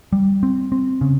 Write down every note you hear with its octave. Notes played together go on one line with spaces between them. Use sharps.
G3
C4
C4
C#3